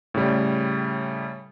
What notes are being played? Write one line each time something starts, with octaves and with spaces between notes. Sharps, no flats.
A2 C#3 G3